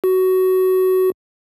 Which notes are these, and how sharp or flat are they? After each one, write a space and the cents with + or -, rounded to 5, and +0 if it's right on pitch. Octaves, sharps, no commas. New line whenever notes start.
F#4 +15